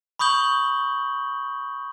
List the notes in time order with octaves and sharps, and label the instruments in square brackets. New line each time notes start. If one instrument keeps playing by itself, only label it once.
[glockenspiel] B5 C#6 D#6 G6 F#7 G7